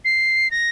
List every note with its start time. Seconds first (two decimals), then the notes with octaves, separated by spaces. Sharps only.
0.05 C7
0.51 A#6